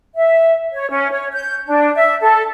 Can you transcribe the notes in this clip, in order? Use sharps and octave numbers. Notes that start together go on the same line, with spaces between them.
E5
C#5
C#4
C#5
G6
D4
E5
A4